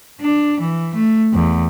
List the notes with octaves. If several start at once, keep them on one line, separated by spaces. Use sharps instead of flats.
D4
E3
A3
E2